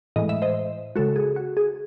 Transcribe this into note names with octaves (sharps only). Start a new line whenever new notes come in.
A2 E3 G#3 D#5
E5
C5 D#5
C#3 G#3 F#4 A4
G#4
F#4
G#4